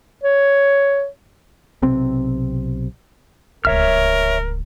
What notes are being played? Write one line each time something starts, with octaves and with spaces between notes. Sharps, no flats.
C#5
B1 C3 C4
D1 C#2 A#4 C#5 E5 F6